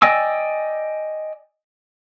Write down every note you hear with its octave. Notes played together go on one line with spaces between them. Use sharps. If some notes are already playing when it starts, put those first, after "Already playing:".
D5 D#5 G5 G#5 E6